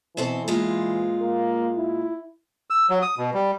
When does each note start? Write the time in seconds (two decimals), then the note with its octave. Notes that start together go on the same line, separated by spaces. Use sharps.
0.17 B2 E3 C4 A4
0.48 A#2 G#3 F4
1.21 A#3
1.77 E4
2.70 E6
2.90 F#3
3.02 D#6
3.18 B2
3.34 G3